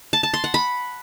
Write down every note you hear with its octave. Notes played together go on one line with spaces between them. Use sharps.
A5
A5
C6
F#5
B5